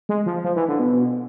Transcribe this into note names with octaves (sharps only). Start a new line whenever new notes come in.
G#3
F3
F3
E3
D3
B2